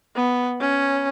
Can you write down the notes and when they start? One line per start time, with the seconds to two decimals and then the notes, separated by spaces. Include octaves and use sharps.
0.16 B3
0.60 C#4